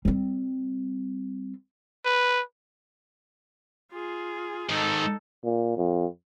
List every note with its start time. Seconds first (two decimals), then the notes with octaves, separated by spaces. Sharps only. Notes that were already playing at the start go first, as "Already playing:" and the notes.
0.05 G3 C4
2.05 B4
3.92 F4 G#4
4.70 G#2 D#3 D#4 A4
5.44 A#2
5.77 F2